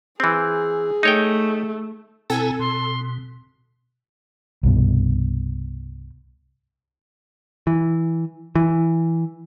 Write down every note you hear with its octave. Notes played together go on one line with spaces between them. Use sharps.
E3 C4 G#4
A3 D#4 C#5 G5
B2 C4 E4 A4 G#5 A#5
B2 C6
C2 G2 B2
E3
E3